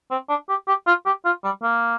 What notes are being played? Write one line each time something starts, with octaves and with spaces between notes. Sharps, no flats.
C4
D4
G4
G4
F4
G4
F4
G3
A#3